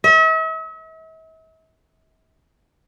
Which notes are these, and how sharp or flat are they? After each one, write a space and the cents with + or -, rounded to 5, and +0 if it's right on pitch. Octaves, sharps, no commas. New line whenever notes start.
E5 -45